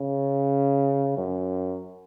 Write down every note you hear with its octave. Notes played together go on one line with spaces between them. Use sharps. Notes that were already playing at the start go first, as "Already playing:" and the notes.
Already playing: C#3
F#2